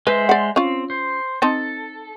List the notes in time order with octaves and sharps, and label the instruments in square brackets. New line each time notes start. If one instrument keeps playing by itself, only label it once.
[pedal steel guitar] G#3 C5 E5 [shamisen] B4
[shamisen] D5 F#5
[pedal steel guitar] C4 [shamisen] C#4 F4
[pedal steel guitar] C5
[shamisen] C4 D#4 A5 [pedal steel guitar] A4